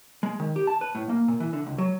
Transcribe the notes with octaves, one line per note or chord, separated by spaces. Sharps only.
G#3
D#3
G4
A5
B4
A2
A#3
A#2
E3
D3
C#2
F#3